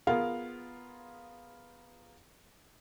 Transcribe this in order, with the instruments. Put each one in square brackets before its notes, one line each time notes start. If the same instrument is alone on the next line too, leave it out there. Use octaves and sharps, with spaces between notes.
[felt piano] B3 F4 G#4 A#4 F5